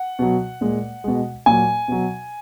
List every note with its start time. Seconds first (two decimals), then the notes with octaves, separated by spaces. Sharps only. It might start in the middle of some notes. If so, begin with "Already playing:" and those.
Already playing: F#5
0.19 B2 F#3
0.61 A#2 G#3
1.04 B2 G#3
1.46 A#2 F#3 G#5
1.88 B2 F#3